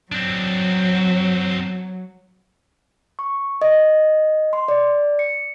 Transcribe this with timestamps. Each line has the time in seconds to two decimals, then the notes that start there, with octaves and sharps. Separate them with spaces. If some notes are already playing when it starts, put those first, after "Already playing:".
0.12 F#3 C4 D4
3.19 C#6
3.62 D#5
4.53 C6
4.68 D5
5.19 C#7